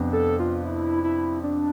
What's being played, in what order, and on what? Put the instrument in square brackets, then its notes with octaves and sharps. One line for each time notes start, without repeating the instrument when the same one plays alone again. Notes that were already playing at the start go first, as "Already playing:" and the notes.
Already playing: [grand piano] F2 C3 B3 D4
[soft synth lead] A4
F4
E4
E4
D4